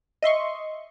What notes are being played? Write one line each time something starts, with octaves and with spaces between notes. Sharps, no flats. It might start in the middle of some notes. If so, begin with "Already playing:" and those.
D#5 E5 C6 C#6